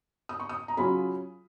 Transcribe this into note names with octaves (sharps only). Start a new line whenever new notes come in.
D#6
C#6
D#6
A#5
C#3 F#3 C#4 F4 B5